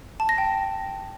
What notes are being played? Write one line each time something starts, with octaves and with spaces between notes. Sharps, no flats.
A5
A#6
G5